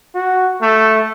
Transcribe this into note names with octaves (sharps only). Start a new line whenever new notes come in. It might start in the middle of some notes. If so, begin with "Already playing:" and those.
F#4
A3